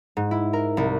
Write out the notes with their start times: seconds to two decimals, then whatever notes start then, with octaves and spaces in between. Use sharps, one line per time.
0.17 G#2
0.31 E4
0.53 A#4
0.77 C2